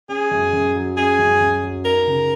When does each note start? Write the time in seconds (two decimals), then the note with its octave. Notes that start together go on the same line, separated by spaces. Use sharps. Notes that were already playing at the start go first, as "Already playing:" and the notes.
0.09 C#4 G#4
0.31 F#2
0.53 F#2
0.75 F#3
0.97 C#4 G#4
1.19 F#2
1.40 F#2
1.63 F#3
1.84 D#4 A#4
2.07 C#3